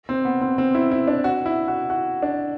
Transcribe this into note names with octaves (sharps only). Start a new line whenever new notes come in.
C4
B3
C4
C4
E4
E4
D4
F#4
E4
F#4
F#4
D4